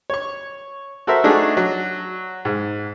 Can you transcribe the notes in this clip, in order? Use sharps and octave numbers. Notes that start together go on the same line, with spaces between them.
C#5 C#6
F#4 A4 A#4 C5 E5
A3 D4 D#4 F#4 G#4
F#3
G#2